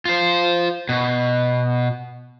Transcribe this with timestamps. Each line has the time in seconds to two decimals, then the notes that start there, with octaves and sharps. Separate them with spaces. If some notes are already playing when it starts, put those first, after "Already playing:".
0.05 F4 C5
0.89 B2